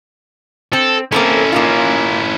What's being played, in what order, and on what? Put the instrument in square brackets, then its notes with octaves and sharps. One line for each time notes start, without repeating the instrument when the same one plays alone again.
[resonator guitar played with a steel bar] C4 [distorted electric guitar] A4
[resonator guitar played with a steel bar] A#3 C4 A4 [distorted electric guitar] C#4 E4
[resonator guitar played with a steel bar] A#3 D#4 F4